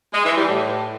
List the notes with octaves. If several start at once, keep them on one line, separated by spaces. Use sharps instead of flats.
G#3
E3
G3
A2